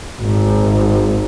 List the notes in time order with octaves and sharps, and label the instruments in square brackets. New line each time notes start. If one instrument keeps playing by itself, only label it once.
[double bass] G#1